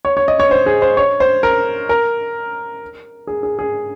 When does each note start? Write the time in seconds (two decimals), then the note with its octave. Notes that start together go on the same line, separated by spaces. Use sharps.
0.05 C#5
0.17 C#5
0.28 D#5
0.40 C#5
0.51 C5
0.66 G#4
0.82 C5
0.97 C#5
1.20 C5
1.43 A#4
1.89 A#4
3.27 G#4
3.43 G#4
3.59 G#4